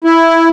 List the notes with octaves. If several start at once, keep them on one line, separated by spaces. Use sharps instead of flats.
E4